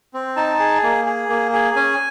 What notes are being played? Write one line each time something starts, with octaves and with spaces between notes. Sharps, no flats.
C4
D#4 A5
G#4
A#3
G#4
A#3
G#4
C#4 G#5